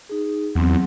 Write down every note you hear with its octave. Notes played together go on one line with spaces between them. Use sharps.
D#4 G#4
E2 F#3 C4